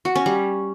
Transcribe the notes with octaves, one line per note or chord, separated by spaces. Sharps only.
F#4
C#4
G3